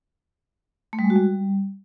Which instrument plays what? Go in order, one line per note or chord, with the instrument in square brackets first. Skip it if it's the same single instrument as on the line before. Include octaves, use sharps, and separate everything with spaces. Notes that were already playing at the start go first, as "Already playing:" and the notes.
[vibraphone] A3
G3
G#3
F#4
G3